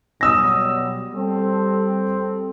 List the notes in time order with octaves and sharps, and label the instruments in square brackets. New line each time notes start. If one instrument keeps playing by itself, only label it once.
[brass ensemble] B2 F#3 G3 [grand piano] D#6 E6 A#6
[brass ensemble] G3 C4 A4